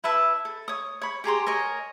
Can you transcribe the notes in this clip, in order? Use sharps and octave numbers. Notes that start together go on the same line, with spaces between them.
E4 B4 E5 A5
A4
C#5 D#6
C#5 B5
G4 G#4 A#5 C6
A#4 C#5 D#5 G#5